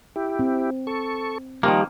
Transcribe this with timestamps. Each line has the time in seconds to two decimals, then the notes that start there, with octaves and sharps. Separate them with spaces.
0.16 E4 G4
0.39 C4
0.87 A4 C#6
1.63 D#3 F3 G3 A#3 G4